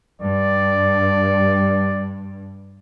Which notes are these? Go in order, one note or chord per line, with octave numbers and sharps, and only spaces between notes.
G2 D5